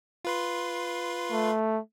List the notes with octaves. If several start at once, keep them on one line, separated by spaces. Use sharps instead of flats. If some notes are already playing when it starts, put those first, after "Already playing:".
F4 B4 C6
A3